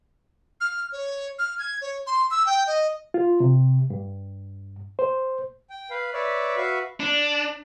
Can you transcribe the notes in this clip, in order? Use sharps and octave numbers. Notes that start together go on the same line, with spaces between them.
F6
C#5
F6
G#6
C#5
C6
E6
G5
D#5
F4
C3
G2
C5
G5
B4 F5
B4 C#5 D5 E5
F#4 B4 E5 F5 C#6
D4